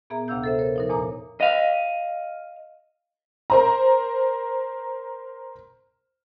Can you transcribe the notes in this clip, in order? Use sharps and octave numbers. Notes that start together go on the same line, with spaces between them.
A#2 B3 G#4 E5 A#5
D2 C3 D4 F5 E6 G6
A4 C5 E5
A#4 C#5
F3 D#4 A#4
E2 A#2 C#5 A#5 D6 D#6
D#5 F5
A#4 C5 A#5